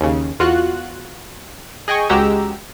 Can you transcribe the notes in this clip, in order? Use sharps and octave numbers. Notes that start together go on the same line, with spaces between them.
D#2 C#3
E2 F4 F#4 F#6
G#4 D#5 G5 G#5 C#6
C#2 G#3 F#4 G4 A#5 E6